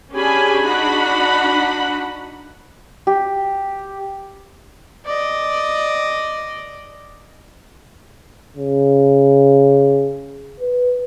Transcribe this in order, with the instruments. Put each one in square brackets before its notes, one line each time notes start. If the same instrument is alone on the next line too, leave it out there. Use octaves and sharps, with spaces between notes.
[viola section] C#4 D4 G4 G#4 G#5 B5
D4 D#4 F#4 F#5 B5
[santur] G4
[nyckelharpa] D5 D#5
[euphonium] C#3
B4